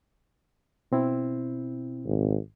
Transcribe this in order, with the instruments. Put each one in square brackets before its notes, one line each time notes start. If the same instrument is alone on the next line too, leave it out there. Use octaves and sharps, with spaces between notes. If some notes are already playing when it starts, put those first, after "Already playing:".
[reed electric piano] B2 C4 E4
[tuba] G#1